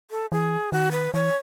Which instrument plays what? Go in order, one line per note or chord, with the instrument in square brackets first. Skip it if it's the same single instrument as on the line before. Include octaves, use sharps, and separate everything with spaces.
[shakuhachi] A4
[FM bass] E3 [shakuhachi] G#4
[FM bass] D#3 [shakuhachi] F#4
[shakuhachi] B4
[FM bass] E3 [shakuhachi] C#5